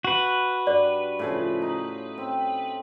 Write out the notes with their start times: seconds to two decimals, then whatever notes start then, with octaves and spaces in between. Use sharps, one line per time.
0.05 F#4 B4
0.67 G2 D5
1.19 A2 C#3 F3
1.62 D#4
2.18 C4